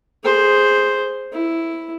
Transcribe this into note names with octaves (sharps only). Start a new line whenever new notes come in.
G#4 C5
E4